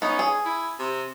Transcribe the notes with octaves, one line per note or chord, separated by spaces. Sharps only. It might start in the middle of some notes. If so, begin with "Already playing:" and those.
B3 C#4 D#4
G#4
E4
C3